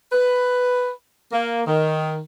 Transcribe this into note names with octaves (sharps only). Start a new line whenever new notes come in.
B4
A#3
D#3